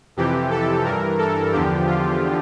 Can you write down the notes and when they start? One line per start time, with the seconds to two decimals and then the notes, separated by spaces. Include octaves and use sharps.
0.17 F2 C3 E3 G4
0.51 A4
0.84 G2 E3 A#4
1.18 A4
1.52 E2 D3 F3 G4
1.87 F4